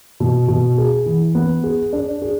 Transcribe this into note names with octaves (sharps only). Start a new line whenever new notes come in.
B2
B2
G#4
E3
B3
G#4
D4
G#4